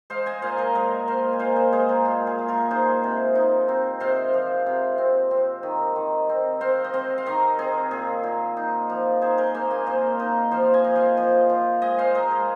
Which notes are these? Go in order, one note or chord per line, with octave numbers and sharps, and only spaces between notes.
G#3 C5 F5
D#5 G#5
A#2 C5 F5
A#4 D#5
G#3 A#4 D#5
A#2 C5 F5
G#5
A#2 C5 F5
G#4 C5
G#3 G#4 C5
F4 A#4
A#2 F4
G#4
G#3
F4 A#4
D#4 G#4 C5
C3
D#4
C4
C3 C5 F5
F3
C3
C4
C4
D#3
D#3
C4
C4 C5 F5
D#5
C4 C5 F5
F5
D#3 A#4 D#5
C4 G#4
A#2 G#4
A#2
D#4
F3
D#4 G#4 C5
A#4 D#5
A#3 C5 F5
D#5 G#5
A#2 C5 F5
D#4 A#4 D#5
F3 C5 F5
D#5 G#5
F3
C5 F5
F3
F3
G#3 D#5 G#5
C5 F5
G#3 A#4 D#5
G#4